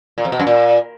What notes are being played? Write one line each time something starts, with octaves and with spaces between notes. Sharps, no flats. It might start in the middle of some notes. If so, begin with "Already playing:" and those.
A#2
F2
B2
F#2
A#2